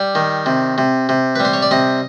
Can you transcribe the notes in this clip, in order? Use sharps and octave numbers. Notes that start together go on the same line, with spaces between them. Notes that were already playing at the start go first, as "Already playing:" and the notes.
Already playing: G3 D5
D#3
C3
C3
C3
B4
G3
C5
C#5
D5
C3 D#5